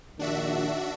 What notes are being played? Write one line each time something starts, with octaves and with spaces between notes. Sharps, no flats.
A#1 D#2 D#3 D4 F#4 E5